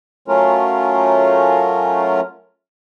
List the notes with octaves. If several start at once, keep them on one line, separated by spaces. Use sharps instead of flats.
F#3 A3 C#4 F4 A#4